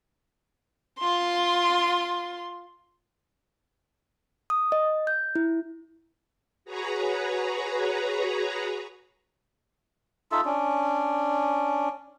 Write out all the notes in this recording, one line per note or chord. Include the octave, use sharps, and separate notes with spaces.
F4 C6
D#6
D#5
G6
E4
F#4 G#4 B4 C#5 A#5
D#4 F4 A4 E5
C#4 D4